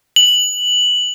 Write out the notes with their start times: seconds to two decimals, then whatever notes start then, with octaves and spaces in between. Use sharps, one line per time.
0.16 F#7